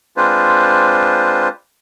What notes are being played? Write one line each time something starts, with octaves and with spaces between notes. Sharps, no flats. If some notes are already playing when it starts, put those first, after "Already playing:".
G#3 C4 D4 F4 B4 C5